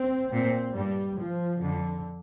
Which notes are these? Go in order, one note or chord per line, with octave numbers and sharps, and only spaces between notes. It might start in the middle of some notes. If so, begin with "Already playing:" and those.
Already playing: C4
A#2 C4
G2 G3
F3
F2 D3